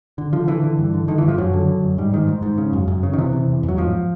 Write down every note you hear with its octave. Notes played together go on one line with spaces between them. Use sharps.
D3
D3 F3
D3 E3
D3
G2
D3
D3 D#3
G2 E3
F3
F#2 F#3
D3
D3
F#2
G#2 G3
G#2 D#3
G#2
G#2
C#3
F#2
F#2
C#3
D#3
C3 E3
C3
E2
E2
F#3
G#2 F3